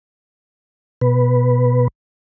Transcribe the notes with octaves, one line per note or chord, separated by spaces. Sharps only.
B2 B4